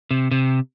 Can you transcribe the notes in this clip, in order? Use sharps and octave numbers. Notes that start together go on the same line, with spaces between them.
C3
C3